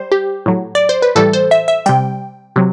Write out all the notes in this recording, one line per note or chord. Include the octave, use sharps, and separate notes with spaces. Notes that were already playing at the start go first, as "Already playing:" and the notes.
Already playing: G3 C5
G4
A2 F#3
D5
C5
B4
A2 E3 G3 A4
C5
E5
E5
C3 G3 G5
C3 F#3